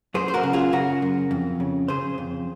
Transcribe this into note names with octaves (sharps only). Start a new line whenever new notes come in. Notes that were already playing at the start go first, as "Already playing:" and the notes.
F#2 G#4 C5
C5
F#4 A#4
C#3
F4 G#4
C#3 F#4 A#4
F#2
F2
C#3
C#3 G#4 C5
F2